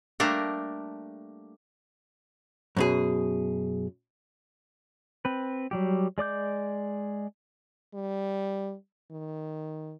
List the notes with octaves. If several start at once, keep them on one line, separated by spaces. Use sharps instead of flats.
G3 A3 A#3 D4 A#4
F#2 B2 G#4
C4 B4
F#3 G3 G4
G#3 D5 D6 G6
G3
D#3